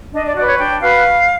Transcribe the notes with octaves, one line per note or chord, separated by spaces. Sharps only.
D4 D#5
D5
F#4 B4 D5
C#5
D4 G5
F#4 B4 F5